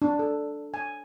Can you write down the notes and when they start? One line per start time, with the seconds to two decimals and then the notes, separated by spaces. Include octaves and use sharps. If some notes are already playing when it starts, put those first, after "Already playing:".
0.02 D4
0.19 A4
0.74 G#5